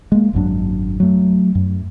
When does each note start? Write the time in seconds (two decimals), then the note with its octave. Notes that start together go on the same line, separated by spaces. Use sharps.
0.12 G#3 A#3
0.33 G#1 F#2 F#3 D4
1.00 F#3 A3
1.55 F#2